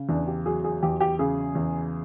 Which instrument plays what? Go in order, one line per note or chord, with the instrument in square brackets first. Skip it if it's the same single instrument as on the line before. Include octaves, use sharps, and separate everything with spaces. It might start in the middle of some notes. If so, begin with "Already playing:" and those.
Already playing: [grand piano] C#3
[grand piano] E2 [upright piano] D4
[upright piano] G4
[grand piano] F#3 [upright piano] G#4
[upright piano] G#4
[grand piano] E2 [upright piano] G4
[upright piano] G4
[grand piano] C#3 [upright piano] G#4
[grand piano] E2